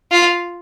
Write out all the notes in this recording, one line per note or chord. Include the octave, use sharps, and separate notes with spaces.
F4